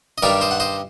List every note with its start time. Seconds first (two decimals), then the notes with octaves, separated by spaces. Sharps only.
0.18 D#5
0.23 G2 D#3 G3 D4 A#4 D5
0.41 C5 D#5
0.51 F#5
0.60 C5 D#5